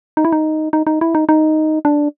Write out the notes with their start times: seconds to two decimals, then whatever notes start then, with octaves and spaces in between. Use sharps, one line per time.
0.17 D#4
0.25 E4
0.32 D#4
0.73 D#4
0.87 D#4
1.01 E4
1.15 D#4
1.29 D#4
1.85 D4